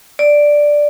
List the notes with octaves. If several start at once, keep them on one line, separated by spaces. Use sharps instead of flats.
D5